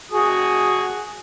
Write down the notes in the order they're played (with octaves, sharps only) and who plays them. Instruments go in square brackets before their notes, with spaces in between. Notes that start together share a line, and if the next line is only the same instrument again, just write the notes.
[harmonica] F#4 G#4 D#6